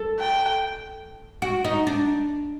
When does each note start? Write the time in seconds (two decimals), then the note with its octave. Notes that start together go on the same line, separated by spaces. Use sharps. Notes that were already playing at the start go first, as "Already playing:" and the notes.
Already playing: A4
0.20 G5
1.42 F#4
1.64 D#4
1.87 D4